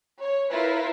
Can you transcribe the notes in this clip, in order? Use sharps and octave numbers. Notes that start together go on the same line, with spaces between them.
C#5
E4 F4 A#4 B4